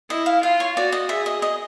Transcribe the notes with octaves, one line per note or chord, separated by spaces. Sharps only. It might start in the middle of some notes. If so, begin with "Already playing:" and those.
E4 D#5
F5
F4 F5
C#5
F#4 D5
D#5
G#4 E5
D#5
D#5